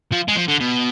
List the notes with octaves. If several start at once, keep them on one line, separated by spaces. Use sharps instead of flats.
F3
G#3
F3
D3
B2